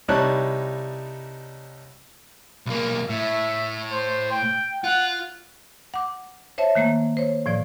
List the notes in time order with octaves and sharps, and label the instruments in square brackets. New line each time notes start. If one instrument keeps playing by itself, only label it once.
[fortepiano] C2 G3 D#4 C#5 A5 F#6
[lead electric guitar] B1 A#3
[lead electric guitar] A2 [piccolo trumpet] E5
[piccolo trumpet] C5
G5
[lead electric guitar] F4 [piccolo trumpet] F#5
[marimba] F#5 D6
C5 C#5 E5 A5
D#3 A3 A#3
C5 C#5
A2 F3 D5